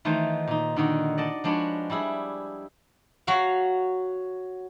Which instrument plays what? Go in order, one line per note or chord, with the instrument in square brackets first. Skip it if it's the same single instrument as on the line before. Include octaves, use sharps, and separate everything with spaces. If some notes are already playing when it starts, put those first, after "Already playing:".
[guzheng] D#3 E3 A3 D#4 F4 C5
A#2 D#4
D3 D#3 D#4 F#4
D5 D#5 F#5 A5
F3 G#3 D4 F#4 B4 C#5
G3 D4 E4 G#4
F#3 F#4 F5